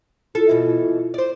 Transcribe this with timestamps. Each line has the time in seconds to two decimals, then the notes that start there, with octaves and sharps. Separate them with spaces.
0.35 E4 F4 A4
0.49 B2 E3
1.14 C5 D5